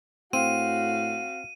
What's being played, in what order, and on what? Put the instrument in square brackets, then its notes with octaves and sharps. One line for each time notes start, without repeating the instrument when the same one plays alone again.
[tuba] A2 [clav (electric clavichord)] C4 [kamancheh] F#4 F5 [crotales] D#7